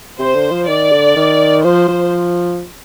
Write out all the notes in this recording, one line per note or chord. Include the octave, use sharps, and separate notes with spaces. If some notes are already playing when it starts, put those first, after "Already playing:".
C3 C5
D3
F3
D#3 D5
D3
D#3
F3 C5
F3